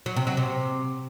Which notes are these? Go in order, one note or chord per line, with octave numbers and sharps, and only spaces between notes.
F#3
C3
F#3
C3